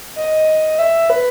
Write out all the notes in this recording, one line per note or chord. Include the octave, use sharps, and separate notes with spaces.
D#5
E5
B4